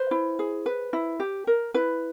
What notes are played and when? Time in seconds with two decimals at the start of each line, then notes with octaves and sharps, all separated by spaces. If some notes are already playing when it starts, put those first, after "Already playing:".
Already playing: B4 C5
0.11 E4
0.39 G#4
0.66 B4
0.93 E4
1.20 G4
1.47 A#4
1.74 E4 B4